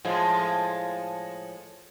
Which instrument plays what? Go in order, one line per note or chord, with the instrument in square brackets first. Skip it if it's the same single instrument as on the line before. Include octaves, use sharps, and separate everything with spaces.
[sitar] A2 F3 G#3